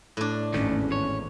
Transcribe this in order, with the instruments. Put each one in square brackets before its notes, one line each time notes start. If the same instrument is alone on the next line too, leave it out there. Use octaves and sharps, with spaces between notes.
[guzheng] A2 D4
[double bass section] G#1 E2 [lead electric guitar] D#3 A3 [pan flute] C#4
[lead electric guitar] C#5